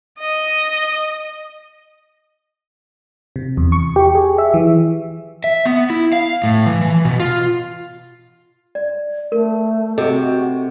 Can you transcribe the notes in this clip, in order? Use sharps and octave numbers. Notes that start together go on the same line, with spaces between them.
D#5
C3
E2
C#6
G4
G#4
E5
E3
E5
B3
E4
F5
A2
E3
E3
B2
F4
D5
A3 A#4
C3 F#4 G#4 A4 D#5